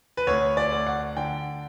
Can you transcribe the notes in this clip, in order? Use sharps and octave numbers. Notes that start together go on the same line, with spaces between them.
B4
D2 C#5
D5
D2
F#5
D3 G5